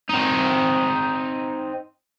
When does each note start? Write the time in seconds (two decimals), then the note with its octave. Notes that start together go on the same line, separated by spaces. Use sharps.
0.09 C4 D#4